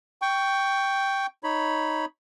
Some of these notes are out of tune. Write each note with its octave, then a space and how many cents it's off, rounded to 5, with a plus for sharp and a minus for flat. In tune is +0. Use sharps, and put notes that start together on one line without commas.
G5 +0 C#6 +10
D#4 +0 C#5 +0 B5 +0